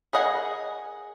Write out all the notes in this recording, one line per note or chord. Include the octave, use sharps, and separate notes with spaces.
G#4 A#4 D#5 F#5 G#5